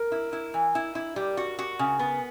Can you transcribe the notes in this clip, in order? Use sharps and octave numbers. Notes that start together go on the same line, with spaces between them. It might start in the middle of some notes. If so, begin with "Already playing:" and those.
Already playing: A#4
E4
E4
E3
E4
E4
G3
F#4
F#4
C#3
B3